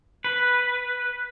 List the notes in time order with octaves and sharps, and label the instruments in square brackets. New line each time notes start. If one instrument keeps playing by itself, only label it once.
[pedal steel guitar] B4